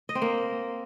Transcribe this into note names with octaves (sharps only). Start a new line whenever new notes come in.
D#5
C4
A#3